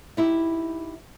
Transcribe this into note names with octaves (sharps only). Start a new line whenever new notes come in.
D#4 E4 G4